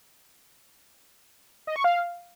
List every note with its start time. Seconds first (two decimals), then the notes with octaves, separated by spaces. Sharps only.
1.67 D#5
1.76 C#6
1.84 F5